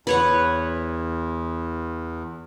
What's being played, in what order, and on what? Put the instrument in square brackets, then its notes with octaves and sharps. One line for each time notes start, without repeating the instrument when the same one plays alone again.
[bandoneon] E2 [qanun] B4 C#5 F#5